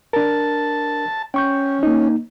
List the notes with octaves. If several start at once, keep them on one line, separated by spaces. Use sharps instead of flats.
D4 A#4 A5
C#4 G5 C#6 G6
A#3 D#4